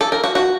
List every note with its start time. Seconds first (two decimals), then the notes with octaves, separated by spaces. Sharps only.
0.01 A4
0.12 A#4
0.24 F#4
0.35 F#4